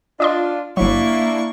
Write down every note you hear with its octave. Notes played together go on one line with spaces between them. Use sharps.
D4 F4 D5 D#5 C6
G1 F#3 A#3 D4 E4 C#6